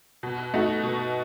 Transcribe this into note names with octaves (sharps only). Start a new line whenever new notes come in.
B2
A3 D#4 F#4
B2